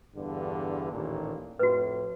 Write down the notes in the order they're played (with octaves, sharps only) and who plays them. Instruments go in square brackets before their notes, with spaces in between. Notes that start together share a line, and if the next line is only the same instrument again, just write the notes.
[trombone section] E2 G2 D3
A1 D#2 A#2
[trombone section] F2 A2 [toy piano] F#4 B4